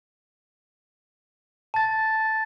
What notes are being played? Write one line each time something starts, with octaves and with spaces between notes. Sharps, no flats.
A5 A6